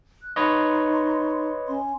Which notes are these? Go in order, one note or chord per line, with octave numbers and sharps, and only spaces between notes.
F#6
D#4 B4 C#5 D#5 C6 C#6
C#4 C6